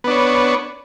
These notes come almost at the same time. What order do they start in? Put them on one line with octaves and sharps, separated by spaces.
B3 D4 C#5